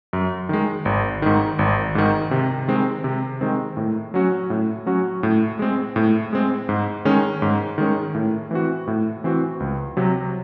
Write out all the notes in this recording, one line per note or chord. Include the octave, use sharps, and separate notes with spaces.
F#2
D#3 G#3
G#1
G#2 D#3
G#1
G#2 D#3
C3
D#3 G#3 C4
C3
D#3 G#3 C4
A2
F#3 C#4 F#4
A2
F#3 C#4 F#4
A2
G#3 C4
A2
G#3 C4
G#2
D#3 G#3 C#4
G#2
D#3 G#3 C#4
A2
E3 C4 F#4
A2
E3 C4 F#4
C#2
C3 F#3